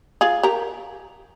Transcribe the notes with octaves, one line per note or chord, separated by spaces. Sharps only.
F4 G#4
G4 A#4